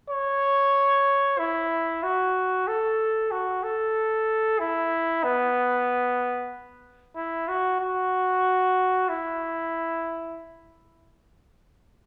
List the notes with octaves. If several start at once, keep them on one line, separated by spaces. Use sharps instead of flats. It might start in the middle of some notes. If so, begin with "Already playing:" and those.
C#5
E4
F#4
A4
F#4
A4
E4
B3
E4
F#4
F#4
E4